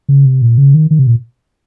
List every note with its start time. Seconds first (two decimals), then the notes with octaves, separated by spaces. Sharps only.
0.09 C#3
0.25 C3
0.42 A#2
0.58 C#3
0.74 D#3
0.91 D#3
0.99 C3
1.07 A#2